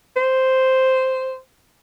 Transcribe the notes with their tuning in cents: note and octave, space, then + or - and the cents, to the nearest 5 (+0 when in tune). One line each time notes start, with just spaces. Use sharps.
C5 -5